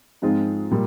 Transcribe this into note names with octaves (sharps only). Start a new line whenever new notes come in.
G#2 F3 G#3 C4 F4
A#2 G3